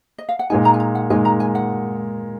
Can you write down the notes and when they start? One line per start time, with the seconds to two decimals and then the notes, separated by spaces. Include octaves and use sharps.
0.18 D#5
0.29 F5
0.39 F#5
0.50 A#2 G#3 D#4 G#5
0.65 A#5
0.74 G#5
0.80 A#5
0.95 F#5
1.10 A#2 G#3 D#4 G#5
1.25 A#5
1.40 G#5
1.55 F#5